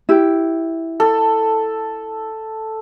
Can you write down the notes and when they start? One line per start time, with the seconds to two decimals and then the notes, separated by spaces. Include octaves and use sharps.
0.09 E4 G4
1.00 A4